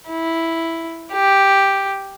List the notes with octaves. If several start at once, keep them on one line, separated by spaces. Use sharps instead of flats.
E4
G4